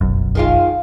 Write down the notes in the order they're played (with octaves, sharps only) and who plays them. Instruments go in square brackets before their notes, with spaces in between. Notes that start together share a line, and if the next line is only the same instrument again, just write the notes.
[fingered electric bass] F1 B1 F#2
[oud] D#3 G#3 F4